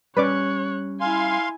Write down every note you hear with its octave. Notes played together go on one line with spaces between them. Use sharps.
G3 C#4 B4 C#5 D5 D6 F#6
E4 F5 G#5 C6